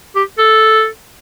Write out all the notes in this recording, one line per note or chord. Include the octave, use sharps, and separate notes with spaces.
G4
A4